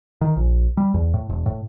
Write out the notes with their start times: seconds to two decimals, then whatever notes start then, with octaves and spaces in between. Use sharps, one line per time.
0.21 D#3
0.36 A#1
0.77 G3
0.94 E2
1.14 A2
1.29 E1
1.46 A2